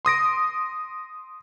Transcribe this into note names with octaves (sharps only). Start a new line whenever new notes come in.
C6 D#6 A#6 D7